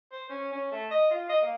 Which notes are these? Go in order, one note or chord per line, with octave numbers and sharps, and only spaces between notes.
C5
C#4
C#4
A3
D#5
F4
D#5
A#3